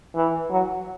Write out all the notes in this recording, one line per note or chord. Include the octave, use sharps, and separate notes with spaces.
E3
F#3